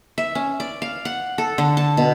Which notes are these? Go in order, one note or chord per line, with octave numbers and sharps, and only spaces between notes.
E5
C#4
D5
F5
F#5
A4
D3
A5
B2